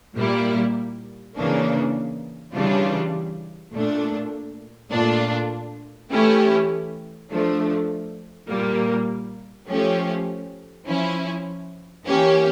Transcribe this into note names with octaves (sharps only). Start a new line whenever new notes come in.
A#2 G3 A#3 E4
C#3 E3 A#3 D4
C#3 E3 G3 D4 F4
A#2 A3 D4
A#2 A3 D4 F4
E3 A3 C#4 E4 G4
F3 A3 D4
A#2 G3 A#3
F3 A3 C#4 G4
F3 C#4 E4
E3 A#3 C#4 G4